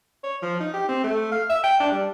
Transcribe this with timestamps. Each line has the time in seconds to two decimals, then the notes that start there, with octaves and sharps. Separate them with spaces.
0.24 C#5
0.42 F3
0.60 D#4
0.73 G4
0.89 C4
1.03 A3
1.32 F5
1.50 E5
1.64 G5
1.80 D4
1.92 G3